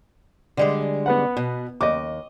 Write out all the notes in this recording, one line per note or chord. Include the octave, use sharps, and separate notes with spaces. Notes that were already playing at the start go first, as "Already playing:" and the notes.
D3 G3 G#3
B3 B4 F#5
B2
D#2 D#5 D6